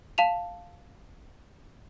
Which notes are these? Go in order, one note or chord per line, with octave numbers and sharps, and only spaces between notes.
F5 A5 E7 F7